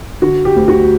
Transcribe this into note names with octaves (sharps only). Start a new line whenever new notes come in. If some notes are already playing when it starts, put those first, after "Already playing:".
D3 F#4
G4
D2
F#4